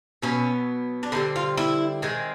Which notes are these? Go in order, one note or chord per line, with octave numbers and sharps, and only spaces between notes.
B2 F#3 B3 C#4
D4
D3 G3 C4 D#4
F4
E4
D#3 G#3 C4